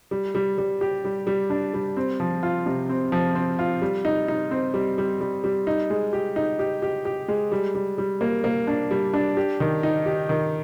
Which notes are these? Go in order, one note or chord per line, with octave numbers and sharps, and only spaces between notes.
G3
G3
G3
G4
G3
G3
D4
G3
C4
F3
F4
C3
C4
F3
C4
F4
G3
D#4
D#4
C4
G3
G3
G3
G3
D#4
G#3
G4
D#4
G4
G4
G4
G#3
G3
G3
G3
A#3
A#3
D4
G3
D4
G4
D#3
D#4
G4
D#3